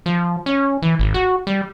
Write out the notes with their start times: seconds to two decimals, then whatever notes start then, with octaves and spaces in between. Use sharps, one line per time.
0.06 F3
0.46 C#4
0.82 E3
0.99 G#1
1.14 F#4
1.47 G3